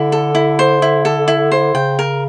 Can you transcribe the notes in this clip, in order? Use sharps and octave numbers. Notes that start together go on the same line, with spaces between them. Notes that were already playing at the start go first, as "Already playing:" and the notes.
Already playing: D3 E4
A4
E4
C5
E4
A4
E4
C5
C#3 G5
A#4